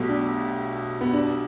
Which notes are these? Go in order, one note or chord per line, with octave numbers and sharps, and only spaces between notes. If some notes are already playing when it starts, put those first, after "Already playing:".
Already playing: B1 B2 A3 B3 G4
D4
B3
D4